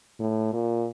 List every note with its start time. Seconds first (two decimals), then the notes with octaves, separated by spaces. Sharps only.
0.19 A2
0.53 A#2